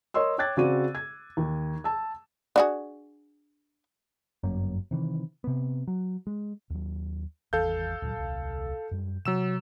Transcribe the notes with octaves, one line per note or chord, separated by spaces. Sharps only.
A#4 C#5 D#5 C6 E6
C#5 G5 D6 F#6 G#6 A6
C#3 C4 F#4 D5 D#7
G#6
D#2
A5 E6
D4 F#4 G#4
G1 F#2 A#3 C#4
C3 D#3 E3
C3 B3
F#3
G#3
D#2 F#3
G#1 E2 E3 A4 F5 G6
D2 A#2 F#3
D#1 C2
F#2 G3
C3 F#3 E6 E7